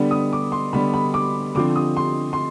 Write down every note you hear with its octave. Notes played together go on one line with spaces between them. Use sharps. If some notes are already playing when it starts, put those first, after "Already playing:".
Already playing: D3 G3 B3 D4
D#6
D6
C6
D3 G3 B3 D4 B5
B5
D6
D3 F3 C4 D6
D#6
C6
C6